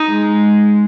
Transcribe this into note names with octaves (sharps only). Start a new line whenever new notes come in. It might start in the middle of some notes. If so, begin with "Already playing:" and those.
Already playing: D#4
G#3